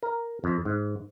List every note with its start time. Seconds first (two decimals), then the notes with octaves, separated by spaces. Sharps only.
0.03 A#4
0.44 F2
0.65 G#2